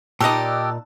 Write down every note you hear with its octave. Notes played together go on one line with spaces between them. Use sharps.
A#2 D#4 G4 D5 D#5 A5 E6 F#6